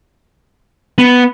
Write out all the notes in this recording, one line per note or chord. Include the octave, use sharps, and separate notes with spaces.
B3